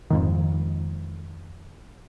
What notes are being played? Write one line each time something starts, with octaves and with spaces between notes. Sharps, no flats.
F2 G#2 D#3